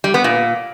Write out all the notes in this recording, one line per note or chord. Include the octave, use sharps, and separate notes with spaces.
G3
B3
A#2